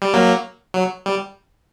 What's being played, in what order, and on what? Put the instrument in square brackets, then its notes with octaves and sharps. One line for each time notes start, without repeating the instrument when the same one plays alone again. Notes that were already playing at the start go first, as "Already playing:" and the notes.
[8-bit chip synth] G3
F#3 A#3
F#3
G3